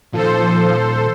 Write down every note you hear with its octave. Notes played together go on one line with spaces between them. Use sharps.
A#2 D#3 F3 A4 C5